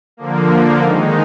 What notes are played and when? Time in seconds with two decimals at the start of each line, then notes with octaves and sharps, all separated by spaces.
0.17 D3 F3 A#3
0.81 D#3 G#3 D#4